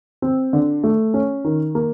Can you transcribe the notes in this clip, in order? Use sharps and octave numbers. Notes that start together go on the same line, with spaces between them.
C4
D3
A3
C#4
D#3
A#3